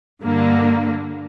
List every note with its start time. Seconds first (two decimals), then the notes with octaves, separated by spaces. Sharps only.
0.23 G2 D3 A#3